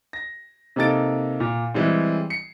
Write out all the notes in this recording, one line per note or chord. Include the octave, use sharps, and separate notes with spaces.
A#6
C3 A#3 D#4 A4 A6 D7
A#2
E3 G3 G#3 C4
C7 C#7